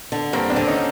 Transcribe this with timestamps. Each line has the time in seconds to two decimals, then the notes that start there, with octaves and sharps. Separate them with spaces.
0.12 D3
0.33 G2 A#3 C4
0.50 C4 D4
0.56 D3
0.67 C#4 D#4